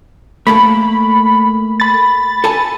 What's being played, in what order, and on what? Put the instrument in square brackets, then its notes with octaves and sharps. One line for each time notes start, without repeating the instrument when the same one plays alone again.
[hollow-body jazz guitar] A3 A#3 A4 [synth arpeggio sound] B5
[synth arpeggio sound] B5 A6
[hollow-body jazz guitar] A4 G#5 A5